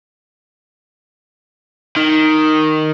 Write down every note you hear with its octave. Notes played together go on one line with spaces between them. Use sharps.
D#3